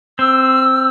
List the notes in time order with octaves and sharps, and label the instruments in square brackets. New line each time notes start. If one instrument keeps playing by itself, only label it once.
[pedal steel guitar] C4 [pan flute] E6